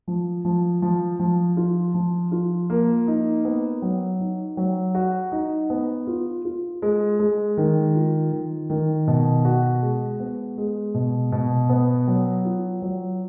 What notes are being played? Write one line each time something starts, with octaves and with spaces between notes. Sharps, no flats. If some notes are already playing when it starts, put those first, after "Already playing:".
F3
F3
F3
F3
F4
F3
F4
A#3
D#4
B3
F#3
D#4
F#3
F#4
D#4
B3
F4
F4
G#3
G#3
D#3
F4
D#3
D#3
B2
F#4
G#3
B3
G#3
B2
B2
B3
F#3
F4
F#3